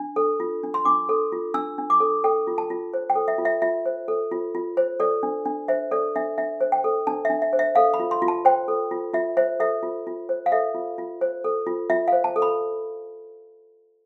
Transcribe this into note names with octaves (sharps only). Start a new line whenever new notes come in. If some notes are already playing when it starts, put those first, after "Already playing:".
Already playing: D4
A4
F4
D4
C6
D4 D6
A4
F4
D4 E6
D4
D6
A4
A4 G5
F4
A5
F4
C5
G5
A4
E5
F4
E5
F4 E5
C5
A4
F4
F4
C5
A4 D5
D4
D4
C5 E5
A4 D5
D4 E5
D4 E5
C5
G5
A4
D4 A5
D4 E5
E5
C5
E5
A4 F5
B5
F4
C6
F4
A5
C5 G5
A4
F4
F4 E5
C5 E5
A4 E5
F4
F4
C5
F5
A4 E5
F4
F4
C5
A4
F4
F4 E5
C5 F5
A5
A4
B5